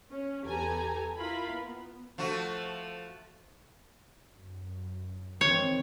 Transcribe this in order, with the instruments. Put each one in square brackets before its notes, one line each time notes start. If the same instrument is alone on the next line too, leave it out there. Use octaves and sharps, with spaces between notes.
[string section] C#4
E2 G4 A4 B4 G#5 A#5
E4 F4 A#4 B5
B3
[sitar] F3 A3 F#4
[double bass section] F#2
[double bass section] D#3 E3 C4 [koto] C#5